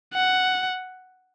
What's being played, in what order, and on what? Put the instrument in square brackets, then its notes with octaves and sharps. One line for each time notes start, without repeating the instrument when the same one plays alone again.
[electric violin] F#5